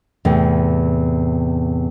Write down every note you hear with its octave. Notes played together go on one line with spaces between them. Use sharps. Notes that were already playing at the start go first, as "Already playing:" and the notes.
E2 A2 C3